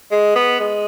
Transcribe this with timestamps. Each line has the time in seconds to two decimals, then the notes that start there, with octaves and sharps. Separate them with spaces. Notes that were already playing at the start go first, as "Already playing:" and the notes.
0.11 G#3
0.35 B3
0.60 G#3